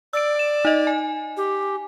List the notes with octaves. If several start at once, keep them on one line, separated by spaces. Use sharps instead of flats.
D5 E6 D7
E7
D#4 D#5
G#5
G4